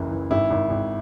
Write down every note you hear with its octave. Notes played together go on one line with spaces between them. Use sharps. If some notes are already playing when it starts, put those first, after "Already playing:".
Already playing: F#1 C#2 E3
E3
G#1 E4
G#1
G#1